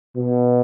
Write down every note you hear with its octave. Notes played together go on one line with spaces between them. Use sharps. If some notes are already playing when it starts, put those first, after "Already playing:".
B2